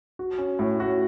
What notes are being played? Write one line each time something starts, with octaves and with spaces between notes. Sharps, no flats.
F#4
C#4
A2
F#4